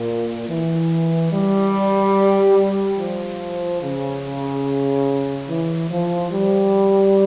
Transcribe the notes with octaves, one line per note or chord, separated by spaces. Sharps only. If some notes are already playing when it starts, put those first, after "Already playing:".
Already playing: A#2
E3
G3
F3
C#3
E3
F3
G3